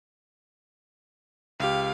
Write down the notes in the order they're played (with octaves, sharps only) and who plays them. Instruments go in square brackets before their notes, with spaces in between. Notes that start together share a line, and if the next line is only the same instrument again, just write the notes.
[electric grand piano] C#2 G4 [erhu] F5